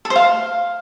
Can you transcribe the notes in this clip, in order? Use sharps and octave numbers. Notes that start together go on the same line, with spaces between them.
A4
C5
F5